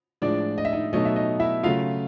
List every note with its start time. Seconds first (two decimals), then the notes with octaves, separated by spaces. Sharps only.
0.22 A2 F3 G#3 D4 D5
0.58 D#5
0.65 E5
0.73 D#4 D#5
0.93 B2 F#3 A3 D#4 D#5
1.05 E5
1.16 D#4 D#5
1.40 E4 E5
1.63 C#3 F#3 A3 F4 F5